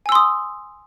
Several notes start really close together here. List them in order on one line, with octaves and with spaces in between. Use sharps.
G#5 E6 C6 D#6